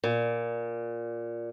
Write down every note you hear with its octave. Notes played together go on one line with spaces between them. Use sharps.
A#2